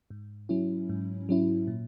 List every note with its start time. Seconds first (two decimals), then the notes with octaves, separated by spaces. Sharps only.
0.10 G#2
0.49 F#3 C#4 E4
0.89 G#2
1.29 F#3 C#4 E4
1.67 A#2